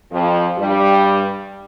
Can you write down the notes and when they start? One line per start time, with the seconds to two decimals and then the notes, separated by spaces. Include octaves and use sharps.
0.12 F2 F3
0.58 G2 G3